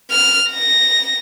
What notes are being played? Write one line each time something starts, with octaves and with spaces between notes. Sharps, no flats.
F6
A#6